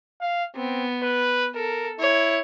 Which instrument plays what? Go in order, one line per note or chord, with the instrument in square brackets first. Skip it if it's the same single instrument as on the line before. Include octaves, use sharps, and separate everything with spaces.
[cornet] F5
[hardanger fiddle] B3 [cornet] C4
[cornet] B4
[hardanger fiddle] A4 [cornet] A#4
[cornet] E4 [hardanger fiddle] C#5